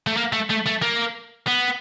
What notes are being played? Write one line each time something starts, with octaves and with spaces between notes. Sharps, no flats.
A3
A#3
A3
A3
A3
A#3
B3